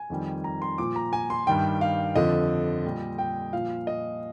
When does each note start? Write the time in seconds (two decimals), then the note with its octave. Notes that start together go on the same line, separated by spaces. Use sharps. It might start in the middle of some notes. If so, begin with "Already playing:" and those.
Already playing: G#5
0.10 F2 D#3 G3
0.44 A#5
0.62 C6
0.78 A#2 F3 D6
0.96 A#5
1.13 G#5
1.30 C6
1.47 G2 D#3 G3 G5
1.81 F5
2.16 F2 D3 F3 D#5
2.84 A#2 G3
3.18 G5
3.53 A#2 F3 F5
3.87 D#5